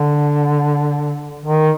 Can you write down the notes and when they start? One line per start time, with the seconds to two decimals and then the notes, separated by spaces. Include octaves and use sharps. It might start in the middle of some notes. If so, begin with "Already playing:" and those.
Already playing: D3
1.45 D#3